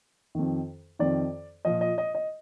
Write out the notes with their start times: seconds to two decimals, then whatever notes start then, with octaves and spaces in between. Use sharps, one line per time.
0.35 F2 D#3
0.99 F2 D#3 D5
1.65 A#2 F3 D#5
1.81 D#5
1.98 D#5
2.15 D#5